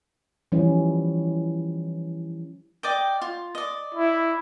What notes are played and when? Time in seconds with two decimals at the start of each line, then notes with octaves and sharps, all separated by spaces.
0.52 E3 F3 G3 C#4 D#4 E4
2.83 D5 D#5 G5
3.22 F4
3.55 D5 D#5
3.94 E4